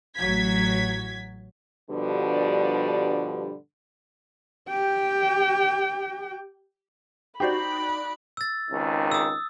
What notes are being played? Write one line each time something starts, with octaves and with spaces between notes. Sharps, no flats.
A1 F#3 G#6 B6
G2 B2 D3 F3 G3
G4 G5
D#4 F#4 G4 C5 D5 B5
E6 A6
G#1 C#2 D#3
D#6 E6